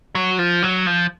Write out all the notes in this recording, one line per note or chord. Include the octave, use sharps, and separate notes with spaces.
F#3
F3
F#3
F3